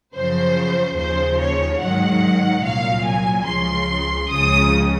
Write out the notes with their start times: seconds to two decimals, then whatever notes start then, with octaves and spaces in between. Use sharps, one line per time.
0.15 F#2 C#3 F3 C5
0.98 D#2 C#3 F3 C5
1.39 C#5
1.81 G#2 D#3 F#3 F#5
2.64 C2 A#2 F#3 F5
3.05 G#5
3.46 C#2 C#3 F3 C6
4.29 C#2 C#3 F3 D#6